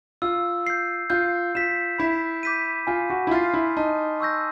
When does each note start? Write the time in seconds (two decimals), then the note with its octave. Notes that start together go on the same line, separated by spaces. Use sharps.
0.22 F4 E6
0.66 G6 C7
1.10 F4 G6
1.55 F4 B6 E7
1.98 E4 B5
2.43 D6 G6 B6 D#7
2.87 F4 G#5
3.10 F#4
3.27 E4
3.31 F4 C6 F6 A6 C7
3.54 E4
3.77 D#4 A5
4.20 C#6 E6 G6 A#6